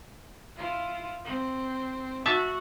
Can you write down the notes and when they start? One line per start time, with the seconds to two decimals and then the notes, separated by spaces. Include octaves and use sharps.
0.57 E4 F4
1.25 C4
2.26 F#4 E5 A5